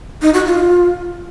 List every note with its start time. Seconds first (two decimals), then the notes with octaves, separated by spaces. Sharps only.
0.22 D#4
0.34 F#4
0.46 F4